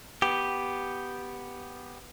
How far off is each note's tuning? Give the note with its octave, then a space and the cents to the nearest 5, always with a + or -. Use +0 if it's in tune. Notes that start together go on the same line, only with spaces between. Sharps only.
B3 -5 G4 +0